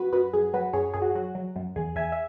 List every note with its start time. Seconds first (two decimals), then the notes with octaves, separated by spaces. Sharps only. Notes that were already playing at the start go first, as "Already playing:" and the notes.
Already playing: F#2 F#4 B4
0.12 F#2 F#4 B4
0.33 F#2 G#4
0.53 F#3 F#4 B4
0.73 F#2 G#4 C#5
0.94 F#2 G#4
1.02 F#4
1.15 F#3 F#4
1.35 F#3
1.56 F#2
1.76 E2 G#4
1.95 E2 E5 G#5
2.12 E5